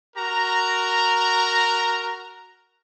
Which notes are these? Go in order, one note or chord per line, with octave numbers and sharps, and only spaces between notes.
F#4 A#4 A#5